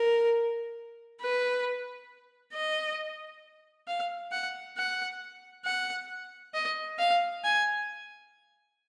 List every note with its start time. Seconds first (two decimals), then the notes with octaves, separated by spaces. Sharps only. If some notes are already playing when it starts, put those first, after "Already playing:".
Already playing: A#4
1.21 B4
2.54 D#5
3.88 F5
4.32 F#5
4.77 F#5
5.65 F#5
6.54 D#5
6.99 F5
7.44 G#5